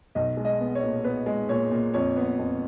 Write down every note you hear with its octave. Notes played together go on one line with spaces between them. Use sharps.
B1 D#5
G#3
D#5
B3
C#5
A#2
B3 B4
G#3
A#2 C#5
A#2
F2 C#5
B3
F2